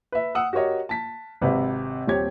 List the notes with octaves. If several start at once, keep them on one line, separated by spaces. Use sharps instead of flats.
B4 E5
F#5 D#6 E6
F#4 G4 A#4 C#5 D#5
A5 B6
G#1 C3 B4 F5
D#1 C4 G4 C#5 G#6